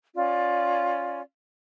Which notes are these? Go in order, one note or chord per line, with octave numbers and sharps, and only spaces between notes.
C#4 F4 D5